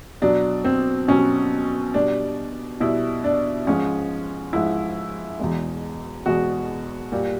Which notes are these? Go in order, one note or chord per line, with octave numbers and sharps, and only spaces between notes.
B2 F#3 D4
C4
B2 F#3 C#4
B2 G3 D4
B2 G3 E4
D4
G#2 F3 G#3 C#4
G#2 F3 G#3 E4
E2 B2 G#3
E2 B2 G#3 F#4
A#2 G3